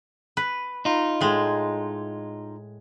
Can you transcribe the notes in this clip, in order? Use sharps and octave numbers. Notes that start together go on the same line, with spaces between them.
B4
D#4 F4
A2 G#3